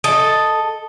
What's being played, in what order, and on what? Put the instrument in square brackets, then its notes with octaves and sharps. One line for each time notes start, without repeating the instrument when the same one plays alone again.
[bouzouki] A4 D#5